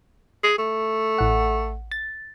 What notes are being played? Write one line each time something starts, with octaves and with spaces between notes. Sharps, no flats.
G#4
A3
A1 F#5
A6